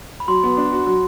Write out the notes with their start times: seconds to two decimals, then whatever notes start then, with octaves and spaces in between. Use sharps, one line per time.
0.20 B5
0.28 F#3 C6
0.43 B3
0.57 D4
0.72 F#4
0.86 F#3